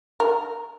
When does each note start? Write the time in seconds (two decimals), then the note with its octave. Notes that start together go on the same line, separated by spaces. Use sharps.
0.20 A#4